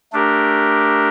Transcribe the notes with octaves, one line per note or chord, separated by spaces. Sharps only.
A3 D4 G4 A#4